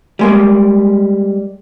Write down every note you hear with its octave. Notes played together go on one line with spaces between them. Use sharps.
G3 G#3 A#3